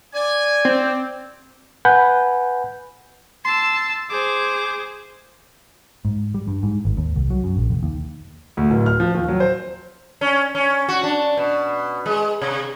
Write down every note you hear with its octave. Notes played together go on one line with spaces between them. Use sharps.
D5 G#5
C4
B4 F#5 G#5 B5 G6
A5 C6 E6
G#4 C5 D6
G#2
G3
G2
G#2
G#1
D#2
C2
F#3
F#2
A#1
F1
D#2
D2
D1
F6
F3
D#2
F#3
C5
C#4
C#4
F#4
D4
B2
G#3
C3